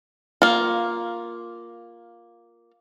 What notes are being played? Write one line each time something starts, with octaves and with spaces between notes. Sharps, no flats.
A#3 F4